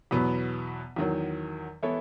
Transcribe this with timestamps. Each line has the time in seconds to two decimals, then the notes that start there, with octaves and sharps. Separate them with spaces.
0.11 E2 B2 F#3 B3
0.96 E2 D#3 F#3
1.83 E3 B3 E4 A4 C#5